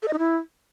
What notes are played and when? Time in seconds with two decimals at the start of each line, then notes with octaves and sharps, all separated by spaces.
0.03 A4
0.08 D#5
0.13 D#4
0.19 E4